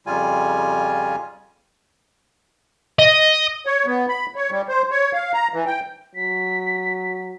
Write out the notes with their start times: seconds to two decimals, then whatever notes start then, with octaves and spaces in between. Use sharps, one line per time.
0.07 F2 C#3 G3 F4 G#5
2.99 D#5
3.66 C#5
3.86 B3
4.09 B5
4.36 C#5
4.51 G3
4.69 C5
4.91 C#5
5.13 F5
5.33 A#5
5.53 E3
5.66 G5
6.15 F#3 B6